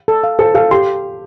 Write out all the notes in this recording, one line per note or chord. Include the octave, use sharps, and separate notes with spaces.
A4
F5
A4 C5
A4 F5
G4 C6